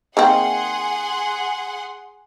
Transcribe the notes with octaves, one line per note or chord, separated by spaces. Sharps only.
D#3 A#3 C4 G#4 F#5 C6